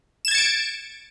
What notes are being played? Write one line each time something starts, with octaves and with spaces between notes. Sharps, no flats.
G#6 A6 C#7 D7 E7